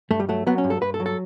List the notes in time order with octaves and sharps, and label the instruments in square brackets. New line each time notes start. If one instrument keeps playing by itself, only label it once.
[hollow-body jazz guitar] G2 A3
G3
F#3 A3
F#3 B3
C#4
G2
A4
G2 B4
A4
F#3
A4